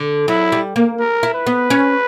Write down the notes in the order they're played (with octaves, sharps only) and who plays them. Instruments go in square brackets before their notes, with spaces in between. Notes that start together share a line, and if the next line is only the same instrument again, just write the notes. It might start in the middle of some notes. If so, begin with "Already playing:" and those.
Already playing: [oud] D3
[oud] F#3 [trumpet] E4
[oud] G3
A#3
[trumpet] A#4
[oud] E4
[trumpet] B4
[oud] B3
C#4